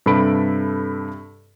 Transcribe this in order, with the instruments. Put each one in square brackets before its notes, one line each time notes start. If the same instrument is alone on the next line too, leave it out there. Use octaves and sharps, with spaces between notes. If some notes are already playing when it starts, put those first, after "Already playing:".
[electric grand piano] G2 C3 A4 B5 D7